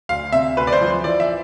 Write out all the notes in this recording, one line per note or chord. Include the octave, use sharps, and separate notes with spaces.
D2 F5
C3 E5
D2 B4
D5
C5
F3
E3 D5
E5